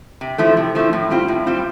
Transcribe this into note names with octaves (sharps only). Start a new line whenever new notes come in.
C3
F3 A3 E4
C3
F3 A3 E4
A2
G3 C4 F4
A2
G3 C4 F4